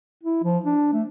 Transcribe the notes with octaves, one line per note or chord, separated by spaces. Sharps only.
E4
F3
D4
A3